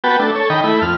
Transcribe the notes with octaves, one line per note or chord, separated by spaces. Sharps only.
B3 F#4 B4 G5 A5
A3 D4
A4 C#5
D#3 D#5 G5 B5
A3 E4 B5
F2 F6